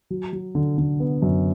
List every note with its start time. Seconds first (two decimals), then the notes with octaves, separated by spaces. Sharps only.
0.10 F#3
0.33 F#3
0.55 D3
0.78 D3
1.00 B3
1.22 F#2